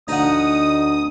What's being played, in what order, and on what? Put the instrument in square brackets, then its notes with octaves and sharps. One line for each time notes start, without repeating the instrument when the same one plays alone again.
[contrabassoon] D2 [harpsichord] D#4 F#5 [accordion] D#6